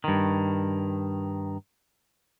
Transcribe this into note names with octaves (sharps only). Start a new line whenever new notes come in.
G2 D#3